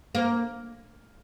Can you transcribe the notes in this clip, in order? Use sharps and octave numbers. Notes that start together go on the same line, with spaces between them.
A#3